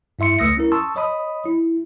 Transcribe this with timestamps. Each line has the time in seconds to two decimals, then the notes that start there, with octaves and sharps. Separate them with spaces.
0.19 G2 E4 E5 C6 C#7
0.39 C#2 A3 D#6 E6 A#6 C#7
0.57 C#4 E4 A#4
0.72 A5 C6 C#6 D#6 E6
0.96 C#5 D#5 B5 D#6
1.45 E4